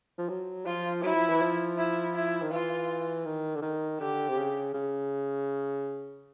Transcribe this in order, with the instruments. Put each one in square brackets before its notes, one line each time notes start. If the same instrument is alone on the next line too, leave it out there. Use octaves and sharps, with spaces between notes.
[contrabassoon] F3
F#3
[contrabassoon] F3 [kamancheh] F4
[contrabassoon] F#3 [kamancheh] E4
[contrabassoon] F3
E3
F3
[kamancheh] E4
E4
[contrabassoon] D#3
[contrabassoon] E3 [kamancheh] F4
[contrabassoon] D#3
D3
D#3
[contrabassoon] D3 [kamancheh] G4
[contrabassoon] C3
C#3
C#3